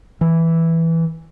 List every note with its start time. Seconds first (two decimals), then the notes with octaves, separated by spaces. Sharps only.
0.21 E3